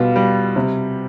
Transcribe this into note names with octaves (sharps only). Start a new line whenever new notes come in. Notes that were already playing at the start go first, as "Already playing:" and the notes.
Already playing: B2 G3 F4
G3
C3